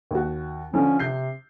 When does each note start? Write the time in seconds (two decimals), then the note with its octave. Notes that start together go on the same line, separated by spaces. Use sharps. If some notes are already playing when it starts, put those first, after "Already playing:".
0.11 D#2 F#4
0.74 D3 F3 C#4
0.99 C3 G6 C7